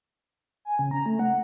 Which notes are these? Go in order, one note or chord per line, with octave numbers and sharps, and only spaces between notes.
G#5
C#3
A#5
A3
F#5